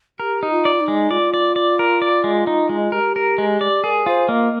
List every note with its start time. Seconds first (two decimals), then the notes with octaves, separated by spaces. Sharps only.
0.19 G4 A#4
0.43 D#4
0.51 F4
0.65 D5
0.80 D#4
0.88 G#3
1.11 F4 D5
1.34 D5
1.56 D5
1.79 A#4
2.02 D5
2.24 G#3
2.47 D#4
2.69 G#3
2.92 G4 A#4
3.16 A#4
3.38 G#3
3.61 D5
3.84 G#4 A#4
4.06 F4 C5
4.29 A#3 D#5